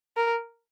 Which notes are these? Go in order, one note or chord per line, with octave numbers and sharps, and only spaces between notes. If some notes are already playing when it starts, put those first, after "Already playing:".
A#4